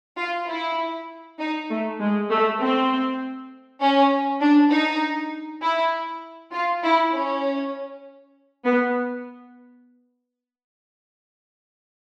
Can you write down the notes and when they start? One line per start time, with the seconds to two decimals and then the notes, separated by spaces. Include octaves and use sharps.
0.18 F4
0.48 E4
1.40 D#4
1.69 A3
2.00 G#3
2.30 A3
2.60 C4
3.81 C#4
4.41 D4
4.71 D#4
5.62 E4
6.52 F4
6.83 E4
7.13 C#4
8.64 B3